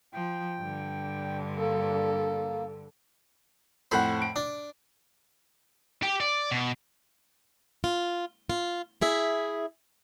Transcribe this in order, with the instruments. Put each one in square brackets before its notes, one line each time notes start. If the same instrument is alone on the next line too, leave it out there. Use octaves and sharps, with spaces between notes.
[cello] F3 [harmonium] G5
[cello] G2 D3
[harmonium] A#3 [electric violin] A4
[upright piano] F2 A2 F#5 [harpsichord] C5 B5
[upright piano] D7
[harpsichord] D4
[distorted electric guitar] G4
D5
B2
[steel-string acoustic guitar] F4
F4
E4 G#4 E5